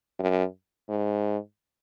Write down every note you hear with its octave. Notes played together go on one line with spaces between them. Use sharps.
F#2
G#2